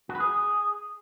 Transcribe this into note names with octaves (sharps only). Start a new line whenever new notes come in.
F#4
B4
G#4